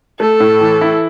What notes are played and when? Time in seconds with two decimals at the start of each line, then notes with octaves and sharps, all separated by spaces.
0.19 A3 A4
0.40 A2
0.61 E3
0.81 E4